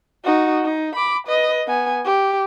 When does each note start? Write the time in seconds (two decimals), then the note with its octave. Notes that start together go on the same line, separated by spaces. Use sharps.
0.24 D#4 F#4
0.64 D#4
0.95 B5 D6
1.27 B4 D#5
1.67 B3 G#5
2.05 G4